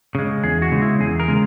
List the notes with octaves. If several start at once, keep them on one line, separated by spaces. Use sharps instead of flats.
C#3 G#3
E2 G#4
F#4
C#3 G#3
E4
E2 G#4
A#4
C#3 G#3